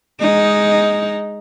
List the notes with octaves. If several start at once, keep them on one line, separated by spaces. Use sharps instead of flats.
G#3 D#4